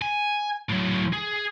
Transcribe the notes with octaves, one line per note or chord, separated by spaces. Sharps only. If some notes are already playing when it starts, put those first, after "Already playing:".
G#5
A2 F#3
G#4